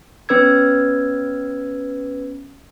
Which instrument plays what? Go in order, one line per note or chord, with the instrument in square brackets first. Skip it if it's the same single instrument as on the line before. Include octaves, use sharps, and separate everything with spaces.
[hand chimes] B3 C#4 B4 E6 G#6